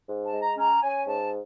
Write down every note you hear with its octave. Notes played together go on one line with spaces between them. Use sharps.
G#2
A5
G#3
A#5
C#4 A#5
C#4 G#5
G#2 A5